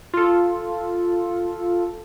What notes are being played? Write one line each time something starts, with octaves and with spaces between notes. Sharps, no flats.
F4 A4